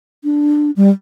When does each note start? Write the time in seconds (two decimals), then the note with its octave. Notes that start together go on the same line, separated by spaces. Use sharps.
0.24 D4
0.76 G3